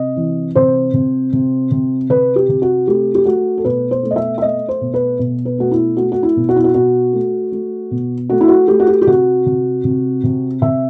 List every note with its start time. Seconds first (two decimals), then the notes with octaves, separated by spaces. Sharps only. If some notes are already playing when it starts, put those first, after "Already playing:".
Already playing: C3 D#5
0.16 E3
0.55 C3 C5
0.93 C3
1.33 C3
1.71 C3
2.09 C3 B4
2.36 G4
2.49 C3
2.62 F#4
2.87 A3 G4
3.15 G4
3.25 A3 F#4
3.57 A4
3.64 B2 B4
3.91 C5
4.03 A3
4.11 D#5
4.16 E5
4.38 E5
4.42 A3 D#5
4.68 C5
4.81 B2
4.94 B4
5.19 B2
5.45 B4
5.58 A3 F#4
5.71 E4
5.97 A3 F#4
6.12 F#4
6.23 E4
6.36 B2
6.49 F#4
6.56 E4
6.64 F#4
6.74 B2 F#4
7.13 A3
7.52 A3
7.91 B2
8.29 A3 F#4
8.41 E4
8.48 F#4
8.68 A3 G4
8.80 F#4
8.88 G4
9.02 G4
9.07 C3 F#4
9.46 C3
9.84 C3
10.24 C3
10.62 C3 E5